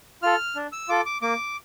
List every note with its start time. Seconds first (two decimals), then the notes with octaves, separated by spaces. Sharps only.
0.23 F4 A4 F6
0.56 D4
0.72 E6
0.88 F4 A4 D6
1.06 D6
1.22 A#3 D6